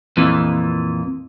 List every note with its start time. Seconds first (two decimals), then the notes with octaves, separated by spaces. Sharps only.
0.17 F2 A#2 E3